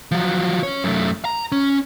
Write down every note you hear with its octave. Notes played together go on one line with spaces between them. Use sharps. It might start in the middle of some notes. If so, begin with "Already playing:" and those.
F3 F#3
C#4 C#5
F#2 A3
A#5
C#4